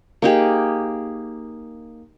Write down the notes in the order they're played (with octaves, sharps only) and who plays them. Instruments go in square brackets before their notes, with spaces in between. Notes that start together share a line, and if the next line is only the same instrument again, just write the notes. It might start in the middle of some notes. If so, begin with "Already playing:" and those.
[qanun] A#3 D#4 G4 G#4